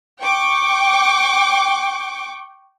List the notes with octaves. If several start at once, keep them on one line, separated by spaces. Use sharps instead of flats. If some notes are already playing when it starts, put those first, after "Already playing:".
G5 C#6 D6